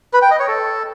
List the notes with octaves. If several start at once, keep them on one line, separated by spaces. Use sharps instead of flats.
B4
G5
D#5
C#5
A4